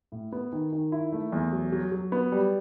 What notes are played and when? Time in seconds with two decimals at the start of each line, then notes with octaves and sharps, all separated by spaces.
0.12 A2
0.32 B3
0.53 D#3
0.73 D#3
0.92 E4
1.12 A3
1.32 E2
1.52 F#3
1.72 F#3
1.92 F#3
2.12 B3
2.32 G3